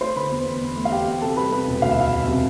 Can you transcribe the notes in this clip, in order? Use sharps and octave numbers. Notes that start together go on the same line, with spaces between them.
A3 C5 C6
D3 B4 B5
E2
E2
E2
A3
F5
E2 G4 G5
E2
C3 A4 A5
G3 B4 B5
C3 B4 B5
E1
D2 F5
E5
E1 F5
E1
C3